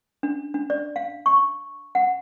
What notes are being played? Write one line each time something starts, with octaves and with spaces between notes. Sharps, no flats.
D4
D4
D5
F5
C#6
F#5